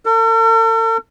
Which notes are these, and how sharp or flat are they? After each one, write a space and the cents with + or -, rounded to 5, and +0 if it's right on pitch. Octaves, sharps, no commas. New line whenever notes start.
A4 +45